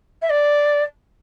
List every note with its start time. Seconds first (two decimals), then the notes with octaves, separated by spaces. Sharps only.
0.22 E5
0.29 D5